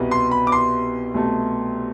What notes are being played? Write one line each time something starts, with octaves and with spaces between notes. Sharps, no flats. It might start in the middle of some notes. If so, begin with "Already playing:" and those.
Already playing: C2 B2 B3
C6
B5
D6
C6
C2 B2 A3